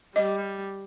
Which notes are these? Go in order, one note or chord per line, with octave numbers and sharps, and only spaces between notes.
G3 D#5